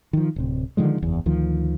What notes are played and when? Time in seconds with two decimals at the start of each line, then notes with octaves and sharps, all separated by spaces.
0.13 D#3 F3
0.36 D1 C3
0.77 D3 D#3 F3 G#3
1.02 F#1 E2
1.26 D2 D#3 F3